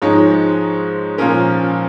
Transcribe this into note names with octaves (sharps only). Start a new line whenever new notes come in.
G#2 F3 G#3 D#4 C#5
A#2 F3 C#4 A#4